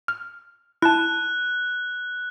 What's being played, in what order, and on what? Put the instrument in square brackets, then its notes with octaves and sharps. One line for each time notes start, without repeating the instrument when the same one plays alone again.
[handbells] F6
[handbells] E4 A5 [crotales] F#6